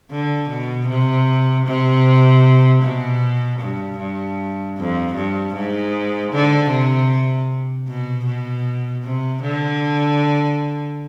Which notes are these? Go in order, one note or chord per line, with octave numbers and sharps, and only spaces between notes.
D3
B2
C3
C3
B2
G2
G2
F2
G2
G#2
D3
C3
B2
B2
C3
D3